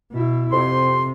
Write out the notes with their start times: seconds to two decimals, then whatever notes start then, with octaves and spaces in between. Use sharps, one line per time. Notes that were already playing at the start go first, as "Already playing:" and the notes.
0.11 B2 E4
0.52 F2 C3 C6